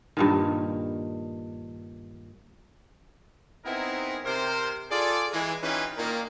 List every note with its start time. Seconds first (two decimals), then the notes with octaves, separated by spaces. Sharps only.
0.17 G2 A#2 D#3
3.65 B3 C4 D#4 E4 G#4 A#4
4.24 C3 A#4 C5
4.91 F4 G#4 A4 D5
5.32 E3 G#3
5.63 E3 C#4 D#4 F4 G4 B4
5.97 A#2 D#3 A#3